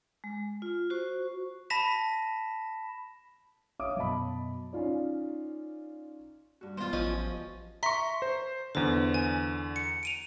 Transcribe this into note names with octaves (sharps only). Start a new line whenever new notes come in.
G#3
F4
F#4 C5 C#6
A5 B5 A#6 B6 E7
C#5 E5 F5 D6 D#6
F#2 B2 D#5 A5 B5
C#4 D#4 F4 D5
G2 F#4
F#2 G#3 B3 F4 C5 C6
A1 F3 C#4 D#5
E5 A#5 C6 C#6 B6
C5
E2 D3 C5
G#5
C#7
D7 D#7 F7